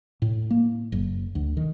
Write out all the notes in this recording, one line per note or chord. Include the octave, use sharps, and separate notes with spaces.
A2
A#3
F#1
D2
D#3